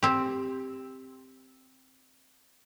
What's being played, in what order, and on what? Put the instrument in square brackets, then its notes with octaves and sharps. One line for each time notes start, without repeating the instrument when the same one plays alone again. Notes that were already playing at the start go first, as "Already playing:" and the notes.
[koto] C4 G4